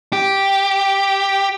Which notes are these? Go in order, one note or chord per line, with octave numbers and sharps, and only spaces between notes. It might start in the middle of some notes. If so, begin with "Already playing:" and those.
G4